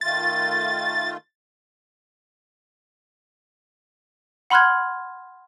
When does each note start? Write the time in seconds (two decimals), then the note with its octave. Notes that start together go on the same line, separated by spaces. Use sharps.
0.01 D#3 A3 F4 A6
4.50 F#5 B5 C6 F6 F#6 G#6